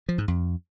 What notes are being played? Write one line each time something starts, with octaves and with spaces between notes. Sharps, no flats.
F3
G#2
F2